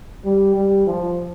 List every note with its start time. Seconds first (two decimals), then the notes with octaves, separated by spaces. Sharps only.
0.25 G3
0.55 G3
0.87 F3